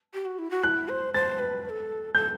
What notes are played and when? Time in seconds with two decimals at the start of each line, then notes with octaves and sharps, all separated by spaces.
0.14 G4
0.25 F#4
0.39 E4
0.51 F#4
0.63 E4 F#6
0.89 C5
1.14 C5 A6
1.39 B4
1.65 B4
1.70 A4
2.14 A4 G6